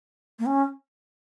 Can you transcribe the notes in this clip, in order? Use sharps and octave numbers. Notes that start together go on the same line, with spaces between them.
A#3
C#4